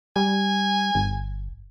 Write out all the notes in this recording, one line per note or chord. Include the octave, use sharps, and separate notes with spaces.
G3 G#5
G1